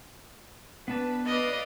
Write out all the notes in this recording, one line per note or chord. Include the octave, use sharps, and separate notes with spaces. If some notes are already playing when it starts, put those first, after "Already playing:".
B3 D4 B4 A5
B4 D5 D#5 F5